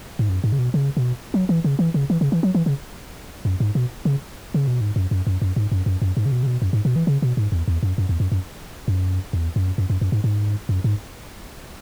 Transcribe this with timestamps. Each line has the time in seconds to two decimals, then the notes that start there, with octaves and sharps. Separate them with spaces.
0.19 G#2
0.29 F#2
0.44 G#2
0.52 C#3
0.59 B2
0.74 C#3
0.97 B2
1.34 F#3
1.49 E3
1.64 C#3
1.79 E3
1.94 C#3
2.10 E3
2.21 C#3
2.32 E3
2.43 F#3
2.55 E3
2.66 C#3
3.45 F#2
3.60 G#2
3.75 B2
4.05 C#3
4.54 C#3
4.67 B2
4.81 G#2
4.96 F#2
5.11 F#2
5.27 F#2
5.42 F#2
5.56 G#2
5.72 F#2
5.86 F#2
6.02 F#2
6.17 G#2
6.26 C#3
6.32 B2
6.43 C#3
6.47 B2
6.62 F#2
6.73 G#2
6.85 B2
6.96 E3
7.07 C#3
7.22 B2
7.37 G#2
7.52 E2
7.68 E2
7.83 F#2
7.98 F#2
8.09 E2
8.20 F#2
8.32 F#2
8.88 F#2
9.33 E2
9.56 F#2
9.78 F#2
9.90 F#2
10.01 F#2
10.12 G#2
10.24 G#2
10.69 F#2
10.84 G#2